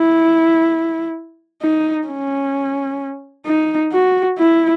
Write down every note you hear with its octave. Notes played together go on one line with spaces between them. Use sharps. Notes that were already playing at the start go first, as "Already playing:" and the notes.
Already playing: E4
D#4
C#4
D#4
F#4
E4